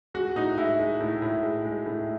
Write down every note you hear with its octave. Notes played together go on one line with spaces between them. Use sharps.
G#3 F#4
A2 D#4
G#3 E4
G#3
A2
A2
G#3
G#3
A2